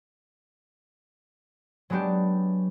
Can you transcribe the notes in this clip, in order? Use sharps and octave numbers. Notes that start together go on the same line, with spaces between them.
F#3 G#3 B3 D4 G4